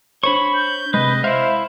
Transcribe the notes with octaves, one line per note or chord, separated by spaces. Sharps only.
D4 C5 C#5 B5 C#6
G6
C3 G#3 B4 D#5
E4 C5 E5 F5